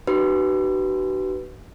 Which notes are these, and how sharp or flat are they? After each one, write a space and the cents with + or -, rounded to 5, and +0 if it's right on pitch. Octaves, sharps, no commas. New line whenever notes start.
D#4 -35 F#4 +45 B4 +0